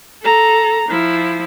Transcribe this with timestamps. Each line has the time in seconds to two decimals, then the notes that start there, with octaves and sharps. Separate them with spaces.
0.23 A4 A#5
0.89 F3 E4